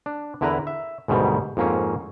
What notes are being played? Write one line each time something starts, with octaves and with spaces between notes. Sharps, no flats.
D4
E2 D3 E4 A#4 B4 A#5
E5
D2 G#2 B2 D#3 G3
F2 G#2 A#3 C4 C#4